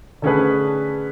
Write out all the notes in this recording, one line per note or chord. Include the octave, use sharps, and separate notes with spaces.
D3 A3 C#4 G#4 B4